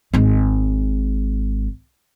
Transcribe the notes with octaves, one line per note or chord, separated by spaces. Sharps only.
G#1 G#3